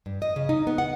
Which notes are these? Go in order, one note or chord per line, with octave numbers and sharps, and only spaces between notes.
G2
D#5
C#3
D#4
B3
F#5